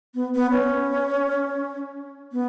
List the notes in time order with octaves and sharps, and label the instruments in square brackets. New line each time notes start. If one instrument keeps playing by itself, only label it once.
[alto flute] B3
B3
C#4
B3